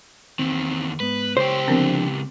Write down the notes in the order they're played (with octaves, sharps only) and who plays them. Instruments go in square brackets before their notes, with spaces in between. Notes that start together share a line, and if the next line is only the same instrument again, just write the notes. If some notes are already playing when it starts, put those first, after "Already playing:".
[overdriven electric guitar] E2 D#3 [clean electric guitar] C4
[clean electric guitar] G#2 B3 [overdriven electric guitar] B4
[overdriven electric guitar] C#2 G4 [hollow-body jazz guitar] C5 [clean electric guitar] C#5
[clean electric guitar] D3 F3 D4 [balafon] B3 C4 A#4